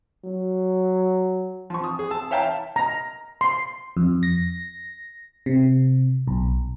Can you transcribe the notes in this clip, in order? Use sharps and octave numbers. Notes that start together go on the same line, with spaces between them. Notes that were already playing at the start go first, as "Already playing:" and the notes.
F#3
F3 C#6
D#6
G#4
A5 E6
C#5 E5 F5 G5 A5 A#5
A#5
C6
F2
A#6
C3
B1